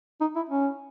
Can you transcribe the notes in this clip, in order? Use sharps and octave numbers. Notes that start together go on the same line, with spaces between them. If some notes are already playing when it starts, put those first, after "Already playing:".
D#4
E4
C#4